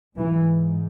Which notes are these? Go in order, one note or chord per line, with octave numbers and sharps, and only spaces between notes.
G#2 E3